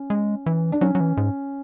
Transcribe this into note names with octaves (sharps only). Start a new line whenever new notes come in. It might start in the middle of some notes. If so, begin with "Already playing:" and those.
Already playing: C#4
G#3
E3
D4
F#3 C#4
F#3
E3
G#2